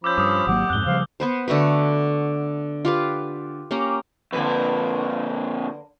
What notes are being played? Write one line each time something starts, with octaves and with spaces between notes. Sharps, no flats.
F3 C#4 B5 D6 E6 G6
G2 D6 D#6
G#1 F#3 A#3 G4 F#5
F2 G#2 F#6 G7
C#3 F3 G3 C4 F5
B3 B4 C5
D3 A3 F#4 B4
F4 G4 B4
A#3 C#4 G4 A#5
F2 A#2 D3 A#3 B4